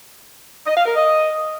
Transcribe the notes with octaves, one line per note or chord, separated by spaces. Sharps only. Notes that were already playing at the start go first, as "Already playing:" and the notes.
D#5
F5
A#4
D#5